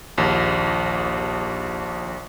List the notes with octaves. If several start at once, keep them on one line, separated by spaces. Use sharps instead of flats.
A#1 D#2